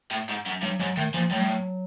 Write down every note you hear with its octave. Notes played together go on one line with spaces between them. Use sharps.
A2
G#2
F#2
G2 F#3
G#2 F#3
A2 D#3
A#2 F3
A2 F#3
G3
F#3